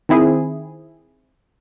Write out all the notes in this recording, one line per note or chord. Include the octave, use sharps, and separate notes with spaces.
D#3 C4 E4 G#4